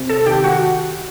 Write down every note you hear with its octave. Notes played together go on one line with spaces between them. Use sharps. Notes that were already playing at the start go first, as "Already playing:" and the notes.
Already playing: C3
A4 A5
D#3 G4 G5
F#4 F#5